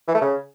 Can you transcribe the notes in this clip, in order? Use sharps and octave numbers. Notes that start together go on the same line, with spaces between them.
E3
A3
C#3